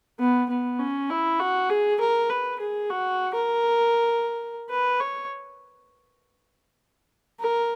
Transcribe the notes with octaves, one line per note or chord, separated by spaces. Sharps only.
B3
B3
C#4
E4
F#4
G#4
A#4
B4
G#4
F#4
A#4
B4
C#5
A#4